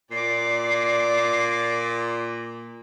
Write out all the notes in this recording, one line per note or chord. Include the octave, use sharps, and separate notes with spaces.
A#2 D5 D6 C7